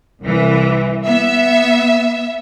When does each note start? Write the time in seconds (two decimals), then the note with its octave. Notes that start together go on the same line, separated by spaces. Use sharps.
0.23 C2 E3
1.05 B3 E5